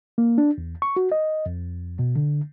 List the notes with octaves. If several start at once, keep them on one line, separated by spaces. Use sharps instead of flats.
A#3
D4
E2
C#6
F#4
D#5
F2
B2
D3